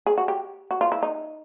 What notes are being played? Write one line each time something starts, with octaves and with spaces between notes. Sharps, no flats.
G#4
F#4
G4
F#4
F4
E4
D#4